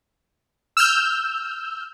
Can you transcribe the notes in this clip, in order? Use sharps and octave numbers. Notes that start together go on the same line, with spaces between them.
E6 F6 G6